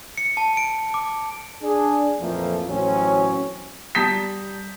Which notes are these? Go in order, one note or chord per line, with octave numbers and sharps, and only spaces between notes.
C#7
A5
D7
D6
D4 G#4
F2 A#2 E3 F3 A3 A#3
A1 F#3 C4 C#4
G3 A5 A#5 D#6 G6 B6